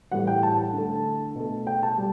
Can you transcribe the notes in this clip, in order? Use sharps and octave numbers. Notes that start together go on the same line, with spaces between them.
A2 E3 G3 F#5
G5
A5
D3 A3
B2 A3
G5
A5
G3